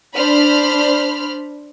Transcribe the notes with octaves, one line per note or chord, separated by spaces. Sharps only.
D4 C5 B5 F6